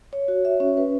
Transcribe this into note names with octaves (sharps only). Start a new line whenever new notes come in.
C#5
F#4
E5
C#4
B4